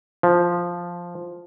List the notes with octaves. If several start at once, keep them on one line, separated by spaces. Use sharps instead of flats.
F3